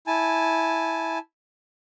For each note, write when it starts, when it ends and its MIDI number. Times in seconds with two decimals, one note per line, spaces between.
0.07 1.18 64
0.07 1.18 80
0.07 1.18 81